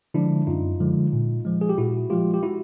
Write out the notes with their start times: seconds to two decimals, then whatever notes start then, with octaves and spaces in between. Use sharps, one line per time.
0.14 D3 F3 G#3 D4 E4
0.47 F#2 D#4 F4
0.80 D3 F3 G#3
1.13 A#2
1.45 F3 G#3
1.61 G#4
1.69 G4
1.78 A#2 E4 F#4
2.10 F3 G#3 F4 G4
2.34 G4
2.43 E4 F#4